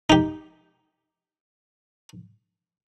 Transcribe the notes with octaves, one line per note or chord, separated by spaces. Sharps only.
D#4 G4